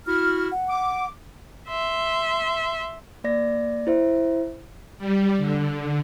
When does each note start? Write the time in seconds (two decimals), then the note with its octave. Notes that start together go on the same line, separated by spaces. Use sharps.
0.06 E4 F#4 F6
0.52 F#5
0.69 D6
1.68 E5 C6
3.24 A#3 D5 A#6
3.87 E4 C5 E5
4.98 G3
5.38 D3